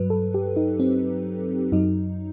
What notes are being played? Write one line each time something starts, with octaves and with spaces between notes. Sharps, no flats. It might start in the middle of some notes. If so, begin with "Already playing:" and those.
Already playing: G2 F#3 B4
A4
G4
D#4
C4
F#2 F#3 D#4